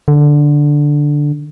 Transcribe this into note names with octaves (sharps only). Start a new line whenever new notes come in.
D3